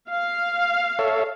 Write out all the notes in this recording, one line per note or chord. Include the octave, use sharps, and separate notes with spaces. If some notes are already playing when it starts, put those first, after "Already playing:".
F5
A4 C#5 E5